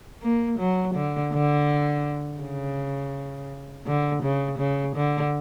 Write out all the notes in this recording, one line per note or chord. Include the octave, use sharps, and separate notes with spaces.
A#3
F#3
D3
D3
C#3
D3
C#3
C#3
D3